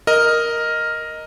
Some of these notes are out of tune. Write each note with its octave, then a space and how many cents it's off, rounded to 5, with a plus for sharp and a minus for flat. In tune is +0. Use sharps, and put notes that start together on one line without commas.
A#4 +0 D#5 +0 A#5 +0